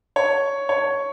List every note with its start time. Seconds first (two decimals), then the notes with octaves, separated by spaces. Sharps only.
0.16 C#5
0.69 C#5